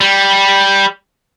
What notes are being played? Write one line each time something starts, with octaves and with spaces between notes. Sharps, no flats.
G3